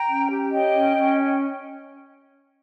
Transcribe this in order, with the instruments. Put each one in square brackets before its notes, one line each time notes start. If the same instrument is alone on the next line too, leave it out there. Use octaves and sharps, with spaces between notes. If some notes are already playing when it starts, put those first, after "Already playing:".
Already playing: [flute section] G5 A#5
C#4
G4
C#5 D#5 G5
C#4
C#4